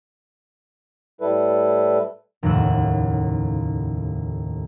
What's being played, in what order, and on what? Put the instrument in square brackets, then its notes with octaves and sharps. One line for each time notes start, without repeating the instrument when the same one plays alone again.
[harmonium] A2 G3 E4 A4 B4
[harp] F1 D#2 A2 C#3 F#5 E6